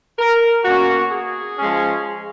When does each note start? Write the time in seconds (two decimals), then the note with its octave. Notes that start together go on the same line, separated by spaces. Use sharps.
0.19 A#4
0.65 B2 A#3 C#4 F#4
1.12 G#4
1.58 F3 G#3 C#4